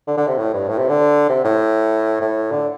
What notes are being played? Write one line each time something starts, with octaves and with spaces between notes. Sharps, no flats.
D3
D3
C3
A2
G2
A2
C3
D3
C3
A2
A2
D3